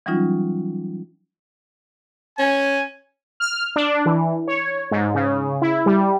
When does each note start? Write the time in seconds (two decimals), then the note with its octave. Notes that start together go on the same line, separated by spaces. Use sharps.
0.06 E3 F#3 G3 C#4 D#4 F4
2.39 C#4 G#5
3.40 F6
3.76 D4
4.06 E3
4.48 C#5
4.91 G#2
5.15 C#3
5.62 E4
5.86 G3